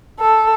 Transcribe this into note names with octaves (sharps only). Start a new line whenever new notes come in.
A4